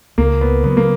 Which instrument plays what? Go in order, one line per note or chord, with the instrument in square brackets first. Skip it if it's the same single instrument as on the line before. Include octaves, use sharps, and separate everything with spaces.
[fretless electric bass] C#2 [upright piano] A#3
[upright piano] B3
[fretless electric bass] C#3 F#3 [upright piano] B3
[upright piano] A#3